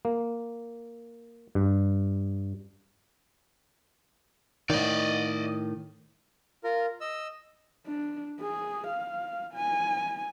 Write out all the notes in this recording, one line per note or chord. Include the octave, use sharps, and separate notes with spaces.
A#3
G2
A2 D#3 D5 D#5
F4 A#4
D#5 E6
D4
G#4
F5
G#5